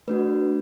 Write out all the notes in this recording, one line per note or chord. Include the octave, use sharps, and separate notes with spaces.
A3 D4 F#4 B4